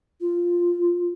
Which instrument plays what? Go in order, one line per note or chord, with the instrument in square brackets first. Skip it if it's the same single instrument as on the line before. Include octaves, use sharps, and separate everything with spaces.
[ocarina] F4